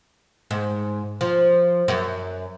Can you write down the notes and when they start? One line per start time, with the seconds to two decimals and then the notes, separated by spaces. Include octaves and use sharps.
0.51 G#2
1.21 F3
1.88 F#2